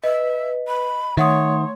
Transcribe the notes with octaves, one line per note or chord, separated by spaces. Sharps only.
B4 D#5 E5
B5
D#3 A3 C#5 E5 F#5 C6 D#6